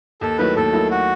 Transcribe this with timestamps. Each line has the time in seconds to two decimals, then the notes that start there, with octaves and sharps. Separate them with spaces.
0.21 D#2 A4
0.38 D#3 F#3 A3 E4 B4
0.56 D#2 A4
0.73 D#3 F#3 A3 E4
0.91 F#4